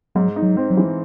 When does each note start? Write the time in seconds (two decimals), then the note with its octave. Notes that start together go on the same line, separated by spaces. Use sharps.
0.15 G#2 F#3
0.36 D#4
0.42 F#3
0.57 C4
0.70 F#3
0.77 E3